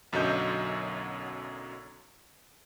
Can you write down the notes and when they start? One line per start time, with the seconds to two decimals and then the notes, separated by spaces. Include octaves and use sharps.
0.12 B1 F#2 D3 F#3 D#5 G6